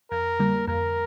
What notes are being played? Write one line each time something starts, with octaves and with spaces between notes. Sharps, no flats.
F2 A#4
D3 G3 A#3
F2 A#4